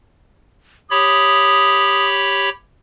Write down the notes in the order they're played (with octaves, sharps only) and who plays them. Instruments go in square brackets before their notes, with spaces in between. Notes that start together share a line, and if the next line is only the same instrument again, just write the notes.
[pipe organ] G4 C#5 B5 [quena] D#6